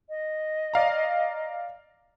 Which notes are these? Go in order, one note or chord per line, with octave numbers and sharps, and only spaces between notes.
D#5
D5 F5 A#5